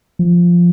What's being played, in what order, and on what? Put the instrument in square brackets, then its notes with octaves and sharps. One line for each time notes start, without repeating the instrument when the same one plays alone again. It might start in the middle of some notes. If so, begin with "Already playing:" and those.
[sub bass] F3